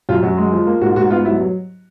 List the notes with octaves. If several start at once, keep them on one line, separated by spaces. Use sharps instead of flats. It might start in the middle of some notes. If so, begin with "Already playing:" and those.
F#2 F4
F#2 F#4
G#3
F3
A#3
G#2 F#4
G#2 F#4
B3 F4
F#3 E4
F#3